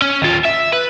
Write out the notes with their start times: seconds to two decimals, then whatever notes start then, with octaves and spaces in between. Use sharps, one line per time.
0.02 C#4
0.22 D#2 F4
0.44 E5
0.72 B4